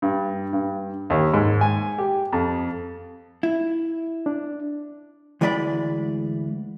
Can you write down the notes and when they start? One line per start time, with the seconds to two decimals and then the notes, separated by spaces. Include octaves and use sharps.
0.02 G2
0.53 G2
1.10 D#2
1.34 G#2
1.61 G#5
1.98 G4
2.33 F2
3.43 E4
4.26 D4
5.41 D2 E3 G#3 D5 E5 B5